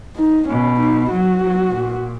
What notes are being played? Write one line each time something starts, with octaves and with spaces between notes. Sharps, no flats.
D#4
B2 C#4
D#4
F#3 F#4
F#3
A#2